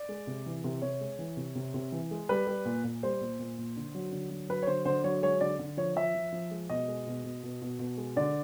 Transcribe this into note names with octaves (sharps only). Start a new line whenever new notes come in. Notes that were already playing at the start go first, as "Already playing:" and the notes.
Already playing: D5
G#3
C3
E3
C3
C3 C#5
G#3
E3
C3
C3
C3
E3
G#3
G3 B4
G3
A#2
A#2
G3 C5
A#2
A#2
A#2
D3
F#3
D3
F#3
F#3 B4
C#5
D3 C5
D3 C5
F#3 C#5
G#3 C#5
D3 D5
D3
F3 C#5
F3 E5
F3
F3
G#3
B2 D#5
G#3
B2
B2
B2
B2
B2
G#3
D3 D5